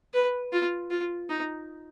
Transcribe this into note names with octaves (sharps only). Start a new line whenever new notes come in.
B4
F4
F4
D#4